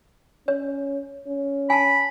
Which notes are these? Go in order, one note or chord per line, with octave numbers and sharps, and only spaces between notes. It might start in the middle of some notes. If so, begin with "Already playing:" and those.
C#4 C#5
C#4
G#5 A5 B5